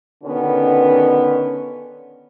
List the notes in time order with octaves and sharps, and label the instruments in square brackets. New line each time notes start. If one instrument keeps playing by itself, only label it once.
[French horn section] B2 D3 D#3 B3 C#4